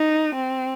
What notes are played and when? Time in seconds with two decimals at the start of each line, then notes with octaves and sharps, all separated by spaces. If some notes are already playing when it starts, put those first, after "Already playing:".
Already playing: D#4
0.35 C4